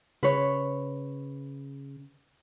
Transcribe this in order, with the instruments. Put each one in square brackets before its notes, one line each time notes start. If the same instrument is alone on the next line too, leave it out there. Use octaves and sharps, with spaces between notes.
[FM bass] C#3 [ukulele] B4 C#5